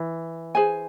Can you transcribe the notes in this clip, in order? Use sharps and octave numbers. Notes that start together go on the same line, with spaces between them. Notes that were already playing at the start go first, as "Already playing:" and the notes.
Already playing: E3
G#4 C5 G#5